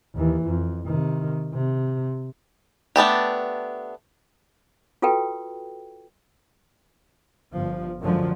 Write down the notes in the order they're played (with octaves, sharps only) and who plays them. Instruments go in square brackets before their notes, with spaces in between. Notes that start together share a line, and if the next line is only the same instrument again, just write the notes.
[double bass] D#2 E3
F2
C3 D#3
C3
[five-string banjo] A3 B3 D4 G4
[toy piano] F4 F#4 A4 B4 G5
[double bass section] G1 F3
F#2 D3 F3 F#3 G#3